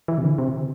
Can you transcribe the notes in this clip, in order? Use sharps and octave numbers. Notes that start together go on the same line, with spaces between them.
E3
C3
D3
C3